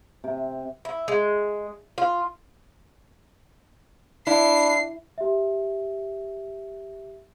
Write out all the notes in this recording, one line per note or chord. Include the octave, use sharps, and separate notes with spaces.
C3
E4
G#3
F4
D4 E4 C7
G4 E5